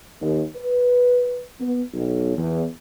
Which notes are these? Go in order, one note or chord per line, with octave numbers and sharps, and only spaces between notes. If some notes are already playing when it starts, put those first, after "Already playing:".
D#2
B4
B3
B1
E2